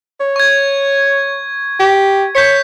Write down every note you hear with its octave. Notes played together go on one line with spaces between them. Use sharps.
C#5
C#6 G#6
G4
C#5 G6 B6 C#7